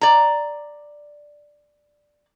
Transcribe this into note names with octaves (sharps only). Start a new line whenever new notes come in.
D5 A#5